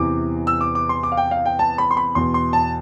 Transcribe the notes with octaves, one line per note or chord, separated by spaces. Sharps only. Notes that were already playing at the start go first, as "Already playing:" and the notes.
Already playing: E2 C3 E3 D6
E6
D6
D6
C6
D6
F5
G5
F5
G5
A5
B5
C6
B5
E2 B2 C6
C6
A5